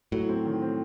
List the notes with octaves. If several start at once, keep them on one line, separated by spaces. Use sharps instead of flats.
A2 F#3
C4
D#3
C4